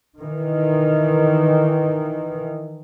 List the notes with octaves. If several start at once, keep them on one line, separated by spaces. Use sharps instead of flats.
D#3 E3